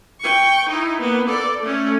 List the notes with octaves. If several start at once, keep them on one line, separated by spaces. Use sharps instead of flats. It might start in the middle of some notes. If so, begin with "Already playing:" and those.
G5 C#6
D#4 E4
A#3 B3
A4 D5
A3 C#4